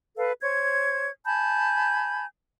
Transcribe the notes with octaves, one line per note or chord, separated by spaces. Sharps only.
A4 B4 F5
C5 C#5 G#6
G#5 A5 B5 G6